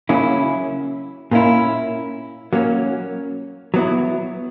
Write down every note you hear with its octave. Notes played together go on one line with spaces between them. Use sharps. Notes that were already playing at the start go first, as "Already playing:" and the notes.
C#3 F#3 A#3 C#4 E4
A#2 A#3 C#4 E4
F#3 A#3 C#4
F#3 B3 E4